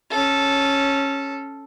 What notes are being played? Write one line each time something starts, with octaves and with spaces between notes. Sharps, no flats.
C#4 A4